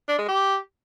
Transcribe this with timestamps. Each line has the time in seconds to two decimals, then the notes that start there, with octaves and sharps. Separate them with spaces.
0.08 D4
0.18 G#3
0.28 G4